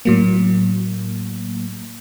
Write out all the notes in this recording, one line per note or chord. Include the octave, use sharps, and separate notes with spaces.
A2 F#3 A#3